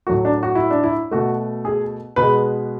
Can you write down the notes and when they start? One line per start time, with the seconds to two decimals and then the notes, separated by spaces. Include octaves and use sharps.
0.07 A2 F#3 A3 F#4
0.25 D4
0.43 F#4
0.55 E4
0.70 D4
0.84 E4
1.11 B2 A3 F#4
1.65 G#4
2.16 B2 G#3 B4